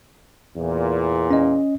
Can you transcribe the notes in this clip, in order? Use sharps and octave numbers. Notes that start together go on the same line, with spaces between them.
E2 A#2
C#4 D#5